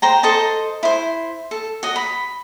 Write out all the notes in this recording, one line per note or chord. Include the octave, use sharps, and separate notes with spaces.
C5 G5 A#5
A4 C5 D#5 A5
E4 C5
A4
F#4 D#5
B5